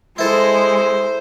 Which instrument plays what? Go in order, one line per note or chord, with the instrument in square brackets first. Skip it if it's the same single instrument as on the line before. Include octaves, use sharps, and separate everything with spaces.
[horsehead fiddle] G#3 [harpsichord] E4 A4 [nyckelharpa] C5